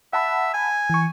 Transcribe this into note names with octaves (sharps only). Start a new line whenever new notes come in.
E5 F#5 A5 B5
G#5
E3 C#6